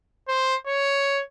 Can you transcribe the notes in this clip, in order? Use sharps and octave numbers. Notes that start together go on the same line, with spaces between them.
C5
C#5